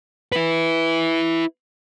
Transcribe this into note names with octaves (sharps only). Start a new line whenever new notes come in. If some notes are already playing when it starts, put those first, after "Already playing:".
E4 B4